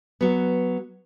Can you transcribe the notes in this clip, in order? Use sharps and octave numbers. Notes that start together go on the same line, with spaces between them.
F#3 B3